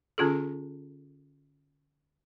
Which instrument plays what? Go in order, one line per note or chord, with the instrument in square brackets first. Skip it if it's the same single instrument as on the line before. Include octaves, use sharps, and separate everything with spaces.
[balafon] D3 C#4 F4 G#4 A4